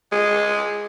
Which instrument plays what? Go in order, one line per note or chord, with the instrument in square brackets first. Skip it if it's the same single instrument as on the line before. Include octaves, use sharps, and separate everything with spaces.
[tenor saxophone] G#3